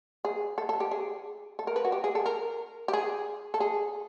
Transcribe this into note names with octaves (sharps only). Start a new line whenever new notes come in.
G#4
A4
A4
G4
G#4
A4
A#4
B4
F#4
G4
G#4
A4
A#4
G4
G#4
A4
G#4